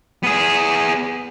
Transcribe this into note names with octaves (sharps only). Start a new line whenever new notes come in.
B3 G#4